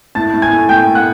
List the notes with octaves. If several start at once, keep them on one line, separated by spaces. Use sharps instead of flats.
A2 A5 A6
A2
G#5 G#6
A3
A3 G5 G6
A3
F#5 F#6